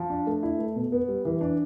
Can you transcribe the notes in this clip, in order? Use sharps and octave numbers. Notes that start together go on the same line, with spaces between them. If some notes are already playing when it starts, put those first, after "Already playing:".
Already playing: F3
D4
A3
E4
A3
B2
B3
G3
E3
D4